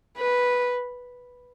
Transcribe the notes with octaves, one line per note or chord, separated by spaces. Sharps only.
B4